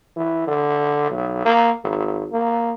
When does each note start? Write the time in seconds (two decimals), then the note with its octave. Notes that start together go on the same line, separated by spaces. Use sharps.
0.16 E3
0.47 D3
1.10 B1
1.45 A#3
1.84 G#1
2.32 A#3